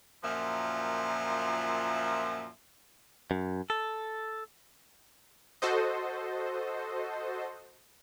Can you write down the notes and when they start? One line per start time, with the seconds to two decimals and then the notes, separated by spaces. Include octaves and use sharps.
0.23 F#2 A#2 F3 E5
3.31 F#2
3.70 A4
5.62 F#4 A4 C5 D#5